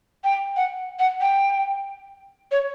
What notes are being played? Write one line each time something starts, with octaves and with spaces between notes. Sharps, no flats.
G5
F#5
F#5
G5
C#5